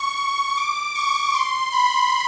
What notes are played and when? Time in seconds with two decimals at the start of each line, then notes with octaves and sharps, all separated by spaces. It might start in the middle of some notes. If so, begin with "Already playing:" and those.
Already playing: C#6
0.57 D6
0.95 C#6
1.34 C6
1.72 B5